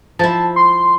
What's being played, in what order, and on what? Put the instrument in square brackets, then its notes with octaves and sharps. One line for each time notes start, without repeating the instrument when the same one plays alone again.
[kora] F3 E4 [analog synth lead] A5
[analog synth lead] C6